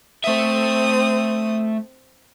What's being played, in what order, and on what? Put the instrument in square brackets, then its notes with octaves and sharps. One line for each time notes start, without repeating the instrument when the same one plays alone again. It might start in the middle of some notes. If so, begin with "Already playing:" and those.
[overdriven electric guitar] A3 E5 [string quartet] C4 D#6